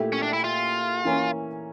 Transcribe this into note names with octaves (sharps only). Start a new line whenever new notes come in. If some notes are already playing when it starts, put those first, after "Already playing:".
Already playing: A#2 A3 E4 G4
C#4
D4
E4
F4
E3 A#3 C#4